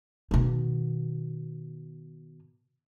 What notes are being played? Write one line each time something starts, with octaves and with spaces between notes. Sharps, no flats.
B2 D#3